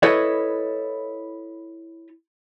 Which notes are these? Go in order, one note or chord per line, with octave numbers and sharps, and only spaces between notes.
E4 A4 B4 C#5 D#5